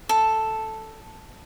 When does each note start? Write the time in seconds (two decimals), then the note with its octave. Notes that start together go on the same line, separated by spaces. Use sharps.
0.09 A4